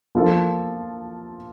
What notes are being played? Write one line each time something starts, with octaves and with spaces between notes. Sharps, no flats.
F3 A#3 F4 A4